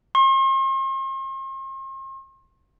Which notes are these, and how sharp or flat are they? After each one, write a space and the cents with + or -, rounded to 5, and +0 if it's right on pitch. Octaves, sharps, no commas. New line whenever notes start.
C6 +45